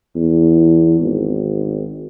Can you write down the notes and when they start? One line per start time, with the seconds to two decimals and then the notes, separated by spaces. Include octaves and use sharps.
0.15 E2
1.00 G#1